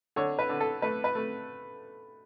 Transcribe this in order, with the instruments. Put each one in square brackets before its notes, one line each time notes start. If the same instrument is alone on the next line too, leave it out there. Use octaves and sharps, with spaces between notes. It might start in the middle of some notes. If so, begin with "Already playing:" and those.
[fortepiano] D3 C#5
B4
D3
A4
A3 B4
B4
A3